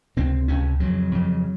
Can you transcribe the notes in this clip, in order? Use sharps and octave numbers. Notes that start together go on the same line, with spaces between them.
C#2 C3 C4
C#2 C3 C#4
F2 C#3 F#3
F2 C#3